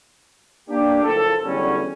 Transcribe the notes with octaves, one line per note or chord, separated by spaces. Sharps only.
A#3 D4 G4
F#1 A2 F3 A#3 A4
E2 D3 F#3 G3 B3 C#4